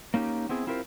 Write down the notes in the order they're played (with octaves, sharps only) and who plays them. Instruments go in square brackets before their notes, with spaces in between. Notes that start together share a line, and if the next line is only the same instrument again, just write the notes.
[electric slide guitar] A#3 C#4 D#4 G4
B3 C4 E4 G#4
C4 E4 F4 G4 A#4 C5